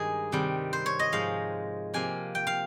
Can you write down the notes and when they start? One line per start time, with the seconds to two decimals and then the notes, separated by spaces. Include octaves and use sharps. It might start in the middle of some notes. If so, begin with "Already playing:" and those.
Already playing: G2 D#3 G#3 G#4
0.32 C3 D#3 G3
0.73 C5
0.86 C#5
0.99 D#5
1.12 G#2 F3 G#3 F5
1.94 C3 F3 A#3 G#5
2.35 G5
2.47 F5